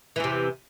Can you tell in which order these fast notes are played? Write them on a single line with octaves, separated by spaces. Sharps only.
E3 E2 C3